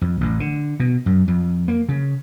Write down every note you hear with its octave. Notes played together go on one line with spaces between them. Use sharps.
F2
A1
D3
B2
F#2
F2
A#3
C#3